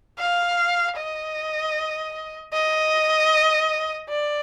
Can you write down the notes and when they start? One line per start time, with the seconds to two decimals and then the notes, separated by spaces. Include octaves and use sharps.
0.18 F5
0.97 D#5
2.53 D#5
4.09 D5